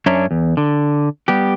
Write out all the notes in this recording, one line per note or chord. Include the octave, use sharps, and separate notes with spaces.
F#2 C#4 D4 C#5 E5 A#5
E2
D3
G3 B3 G4